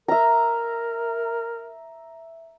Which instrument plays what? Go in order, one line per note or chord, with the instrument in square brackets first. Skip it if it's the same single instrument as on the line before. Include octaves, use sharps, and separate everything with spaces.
[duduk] A#4 [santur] E5 A#5